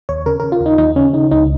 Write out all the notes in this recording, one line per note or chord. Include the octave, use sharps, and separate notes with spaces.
D#2 C#5
C#3 A#4
C#3 A#4
F4
D#2
D#4
D#2 D#4
C#3 C#4
C#3 D#4
C#2 D#4